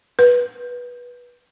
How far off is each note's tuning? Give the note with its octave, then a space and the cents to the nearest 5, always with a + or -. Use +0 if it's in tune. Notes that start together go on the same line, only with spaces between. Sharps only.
B4 -15